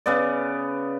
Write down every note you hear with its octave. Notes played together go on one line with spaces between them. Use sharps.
C#3 B3 D5